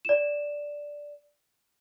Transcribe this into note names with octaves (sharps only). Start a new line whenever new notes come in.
D5 E7